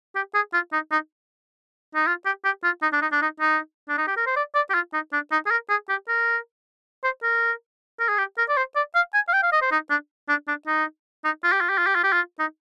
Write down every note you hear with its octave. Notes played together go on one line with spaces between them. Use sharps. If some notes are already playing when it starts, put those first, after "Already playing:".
G4
G#4
F4
D#4
D#4
D#4
F4
G4
G4
F4
D#4
D4
D#4
D4
D#4
D#4
D4
D#4
G4
A#4
C5
D5
D5
G4
F4
D#4
D4
D#4
G#4
A#4
G#4
G4
A#4
C5
A#4
A#4
G#4
G4
A#4
D5
C5
D5
F5
G#5
F5
G5
F5
D#5
C5
D#4
D4
D4
D4
D#4
D#4
F4
G4
F4
G4
F4
G4
F4
G4
F4
D#4